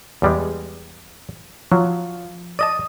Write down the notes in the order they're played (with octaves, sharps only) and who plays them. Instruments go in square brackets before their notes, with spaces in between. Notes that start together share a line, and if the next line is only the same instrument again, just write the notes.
[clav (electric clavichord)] E2 G3 G#3
[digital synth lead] F3 [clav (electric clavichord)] F#3
[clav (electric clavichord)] D5 D#5 A5 [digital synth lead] D#6